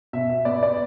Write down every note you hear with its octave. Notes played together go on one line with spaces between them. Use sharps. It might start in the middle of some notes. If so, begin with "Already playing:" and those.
B2 E5
E5
B3 D5
D5